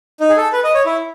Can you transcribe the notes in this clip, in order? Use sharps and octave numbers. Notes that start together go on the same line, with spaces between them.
D#4
G#4
A4
B4
D#5
C#5
E4